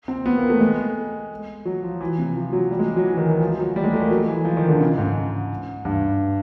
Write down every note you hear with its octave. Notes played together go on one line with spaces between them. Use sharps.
C4
B3
A#3
A3
G#3
F#3
F3
E3
C3
F3
F#3
G3
G#3
F#3
E3
D#3
E3
F3
F#3
G3
G#3
A3
A#3
F#3
E3
F3
D#3
D3
C#3
G#2
G2